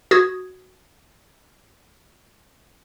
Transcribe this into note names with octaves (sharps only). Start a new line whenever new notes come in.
F#4 D#6 G#6